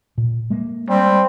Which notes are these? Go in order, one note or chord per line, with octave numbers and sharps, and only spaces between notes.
A#2
G#3 A#3
G3 C4